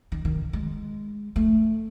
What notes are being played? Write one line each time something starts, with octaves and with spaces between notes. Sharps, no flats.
D#3
D#3
G#3
A3